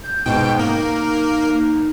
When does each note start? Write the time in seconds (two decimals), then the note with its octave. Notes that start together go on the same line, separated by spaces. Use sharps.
0.03 G6
0.26 G#2 B2 D#4 G5
0.59 A#3 A#4